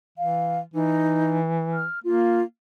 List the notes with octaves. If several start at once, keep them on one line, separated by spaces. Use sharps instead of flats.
E3 F5
E3 D#4
F6
A#3 F4